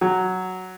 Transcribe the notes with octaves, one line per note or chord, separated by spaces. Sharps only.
F#3